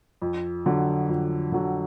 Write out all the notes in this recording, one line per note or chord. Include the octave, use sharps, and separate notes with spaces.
F2
D3 F#3
F2
D3 F#3